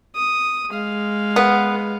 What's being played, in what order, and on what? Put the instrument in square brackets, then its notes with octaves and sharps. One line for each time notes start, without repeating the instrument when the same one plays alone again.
[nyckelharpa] D#6
G#3 F5
[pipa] B3